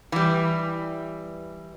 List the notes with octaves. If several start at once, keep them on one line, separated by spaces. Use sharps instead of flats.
E3 G3